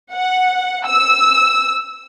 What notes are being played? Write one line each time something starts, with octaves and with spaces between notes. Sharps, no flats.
F#5
E6